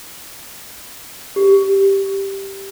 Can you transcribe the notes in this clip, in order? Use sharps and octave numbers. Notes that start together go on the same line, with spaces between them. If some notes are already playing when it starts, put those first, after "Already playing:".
G4